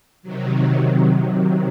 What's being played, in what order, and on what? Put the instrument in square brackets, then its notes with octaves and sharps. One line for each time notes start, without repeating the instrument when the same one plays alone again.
[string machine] C3 D#3 F#3